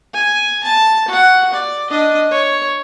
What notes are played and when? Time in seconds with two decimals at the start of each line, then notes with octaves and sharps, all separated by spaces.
0.14 G#5
0.64 A5
1.08 F#4 F#5
1.53 D5
1.90 D4 D#5
2.31 C#5